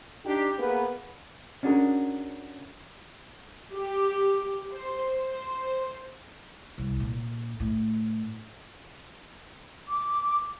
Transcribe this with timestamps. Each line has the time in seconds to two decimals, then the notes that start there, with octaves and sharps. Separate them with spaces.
0.25 D4 D#4 G4
0.58 A#3 B3 G#4 A#4 B4
1.63 C#4 D4 F#4 G#4 A#4
3.72 G4
4.72 C5
5.18 C5
6.78 C2
7.00 A#2
7.60 A2
9.88 D6